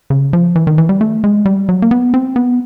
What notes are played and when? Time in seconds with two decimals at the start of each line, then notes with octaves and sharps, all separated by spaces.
0.10 C#3
0.33 F3
0.56 E3
0.67 D#3
0.78 E3
0.89 G3
1.01 A3
1.24 G#3
1.46 G3
1.69 F#3
1.82 A#3
1.91 B3
2.14 C4
2.36 B3